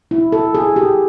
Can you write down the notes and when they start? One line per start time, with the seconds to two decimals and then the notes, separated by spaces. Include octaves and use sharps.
0.11 E4
0.32 A4
0.55 G#4
0.76 G4